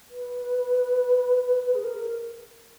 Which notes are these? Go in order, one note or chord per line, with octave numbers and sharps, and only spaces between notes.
B4
G#4
A#4